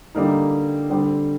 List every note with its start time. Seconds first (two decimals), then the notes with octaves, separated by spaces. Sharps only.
0.15 D3 G3 A#3 D#4
0.90 D3 G3 C4